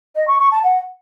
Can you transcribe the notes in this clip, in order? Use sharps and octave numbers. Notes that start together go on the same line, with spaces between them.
D#5
C#6
C#6
A5
F#5